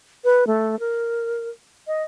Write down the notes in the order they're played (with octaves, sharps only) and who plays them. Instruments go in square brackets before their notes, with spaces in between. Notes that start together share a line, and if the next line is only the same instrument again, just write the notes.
[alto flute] B4
A3
A#4
D#5